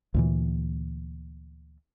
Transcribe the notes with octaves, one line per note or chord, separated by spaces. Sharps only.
D2 A#2 E3